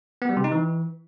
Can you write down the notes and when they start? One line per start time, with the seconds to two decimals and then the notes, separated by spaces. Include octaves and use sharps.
0.22 B3
0.29 G3
0.37 C3
0.44 D#4
0.52 E3